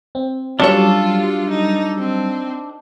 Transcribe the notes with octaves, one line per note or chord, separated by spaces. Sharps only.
C4
F#3 G3 C#4 D4 F4 A4 C#5
D#4
C4